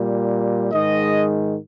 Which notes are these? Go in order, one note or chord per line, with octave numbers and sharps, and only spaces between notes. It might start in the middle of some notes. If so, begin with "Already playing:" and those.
Already playing: A#2 G3
G#2 D#3 G#3 D#5